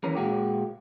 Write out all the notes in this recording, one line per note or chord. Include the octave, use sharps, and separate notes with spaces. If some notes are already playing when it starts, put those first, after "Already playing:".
D#2 E3 C#4 A#4
A#2 G#3 F#4 G4